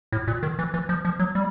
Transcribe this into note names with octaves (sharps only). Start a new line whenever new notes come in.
A2
A#2
D#3
E3
E3
F3
F3
F#3
G3